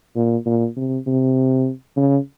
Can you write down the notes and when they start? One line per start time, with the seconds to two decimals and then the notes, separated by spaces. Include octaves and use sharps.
0.16 A#2
0.46 A#2
0.77 C3
1.07 C3
1.97 C#3